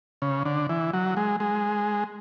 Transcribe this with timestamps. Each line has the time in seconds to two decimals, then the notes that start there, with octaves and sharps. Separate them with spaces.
0.22 C#3
0.45 D3
0.69 E3
0.93 F#3
1.17 G#3
1.40 G#3